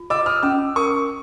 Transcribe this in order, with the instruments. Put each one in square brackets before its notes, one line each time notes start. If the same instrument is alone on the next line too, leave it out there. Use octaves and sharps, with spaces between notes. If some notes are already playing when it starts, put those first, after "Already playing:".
Already playing: [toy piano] F4
[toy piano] D#5 [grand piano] D6 E6
[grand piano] D#6 F6
[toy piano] C#4 [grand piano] D6 E6
[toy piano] A#4 [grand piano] C#6 D#6